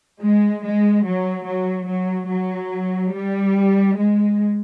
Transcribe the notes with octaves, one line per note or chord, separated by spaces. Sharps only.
G#3
G#3
F#3
F#3
F#3
F#3
G3
G#3